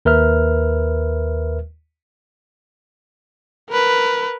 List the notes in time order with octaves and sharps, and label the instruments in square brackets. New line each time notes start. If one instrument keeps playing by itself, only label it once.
[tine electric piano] D#2 A#4 B4 E5 F6
[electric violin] A#4 B4